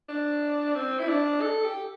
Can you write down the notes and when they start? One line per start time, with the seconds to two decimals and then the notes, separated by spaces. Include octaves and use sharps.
0.09 D4
0.75 C4
0.99 E4
1.08 D4
1.41 A4
1.64 G4